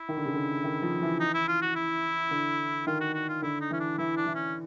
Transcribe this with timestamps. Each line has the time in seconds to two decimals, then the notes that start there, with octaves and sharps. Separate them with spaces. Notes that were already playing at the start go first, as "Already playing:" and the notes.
Already playing: E4
0.09 D#3
0.17 D3
0.25 C#3
0.35 D3
0.64 D#3
0.82 F3
1.02 E3
1.20 D#4
1.34 E4
1.48 F4
1.62 F#4
1.75 E4
2.31 D3
2.87 D#3 F4
3.01 F#4
3.15 F#4
3.29 F4
3.42 D3 E4
3.61 D#4
3.71 E3 C#4
3.80 D4
3.98 E3 E4
4.17 D4
4.26 E3
4.35 C#4